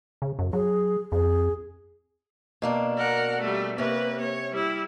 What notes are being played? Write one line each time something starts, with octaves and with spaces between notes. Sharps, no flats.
C#3
F#2
F#3 G#4
F2 G#4
B2 A#3 D4
A#4 F#5
G3 A3
C3 A#3 C#4 B4
C#5
G3 E4